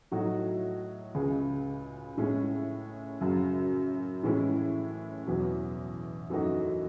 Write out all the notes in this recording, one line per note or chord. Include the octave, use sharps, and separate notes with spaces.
A2 F#3 A3 D#4 F#4
C#2 C#3 G#3
A2 G#3 C#4
F#2 C#3 F#3
A2 E3 G#3 C#4 E4
E2 B2 F#3
F#2 E3 A3 D#4 F#4